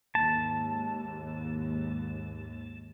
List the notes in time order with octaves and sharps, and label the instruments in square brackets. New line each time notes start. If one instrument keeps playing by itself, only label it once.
[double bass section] D#2 G#2 [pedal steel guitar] A5